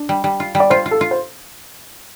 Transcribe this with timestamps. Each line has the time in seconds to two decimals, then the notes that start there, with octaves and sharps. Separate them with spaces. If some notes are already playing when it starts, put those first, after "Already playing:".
Already playing: D4
0.09 G3
0.24 G3
0.40 F4
0.55 G3
0.60 D5
0.70 F4 C5
0.86 F4
0.91 A4
1.01 F4
1.11 C5